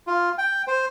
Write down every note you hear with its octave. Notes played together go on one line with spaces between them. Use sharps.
F4
G5
C5